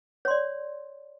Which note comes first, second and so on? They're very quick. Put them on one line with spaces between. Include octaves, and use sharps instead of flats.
C#5 C6 D5